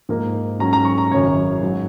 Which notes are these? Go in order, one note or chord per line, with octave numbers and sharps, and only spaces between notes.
G#2 F3 A#3
G#2 F#3 C#4 A#5
A#5
C#6
A#5
G#1 F#2 C#3 C#5
G#2 F#3